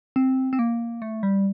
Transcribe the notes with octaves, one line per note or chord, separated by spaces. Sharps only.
C4
C4
A#3
A3
G3